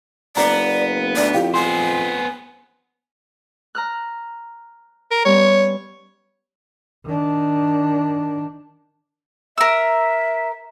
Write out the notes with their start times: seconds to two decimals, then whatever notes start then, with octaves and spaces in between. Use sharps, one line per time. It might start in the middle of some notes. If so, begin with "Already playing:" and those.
0.37 F#1 B3 D5 A#5
1.17 D2 D5
1.34 F2 E4 G4 F5 G5
1.54 B3 C5 G#5 C6
3.75 A#5 F6 F#6
5.11 A#4
5.25 G3 B3 C#4 C#5
7.06 D#3 D4
9.58 A#4 E5 E6